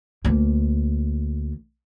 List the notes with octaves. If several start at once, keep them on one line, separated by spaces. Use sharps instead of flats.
D2 A#3